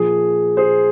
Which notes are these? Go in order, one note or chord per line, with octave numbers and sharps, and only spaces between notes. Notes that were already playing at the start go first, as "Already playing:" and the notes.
Already playing: A#2 F3 G#4
G#4 C5